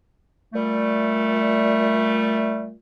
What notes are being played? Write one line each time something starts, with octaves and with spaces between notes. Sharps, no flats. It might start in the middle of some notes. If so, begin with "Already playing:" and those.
A#2 G3 A3